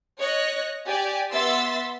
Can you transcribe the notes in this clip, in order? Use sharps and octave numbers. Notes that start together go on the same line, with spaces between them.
C#5 D#5 F#6 A#6
G4 D5 G#5
B3 E5 C6 E6 A6 B6